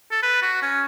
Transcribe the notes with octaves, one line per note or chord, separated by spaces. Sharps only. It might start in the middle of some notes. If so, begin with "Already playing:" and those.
A4
B4
F#4
C#4